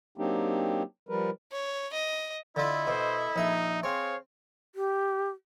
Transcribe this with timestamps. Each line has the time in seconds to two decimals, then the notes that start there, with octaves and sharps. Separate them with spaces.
0.18 F#3 A#3 C4 D4 D#4 G4
1.09 F3 G3 A#4 B4
1.52 C#5
1.93 D#5
2.56 D3 E4 F4 A4 D#5
2.87 B2 C5
3.36 A#1 D#4 E5
3.84 C4 G#4 C5 C#5 F5
4.75 G4